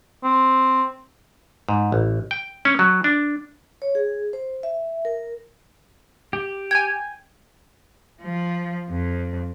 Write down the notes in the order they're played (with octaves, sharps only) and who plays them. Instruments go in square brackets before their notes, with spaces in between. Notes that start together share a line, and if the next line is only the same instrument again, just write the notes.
[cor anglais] C4
[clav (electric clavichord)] G#2
A1
G5
C#4
F#3
D4
[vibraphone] C#5
G#4
C5
E5
A#4
[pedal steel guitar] G4
[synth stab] G5 G#5 [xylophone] G#6
[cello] F3
F2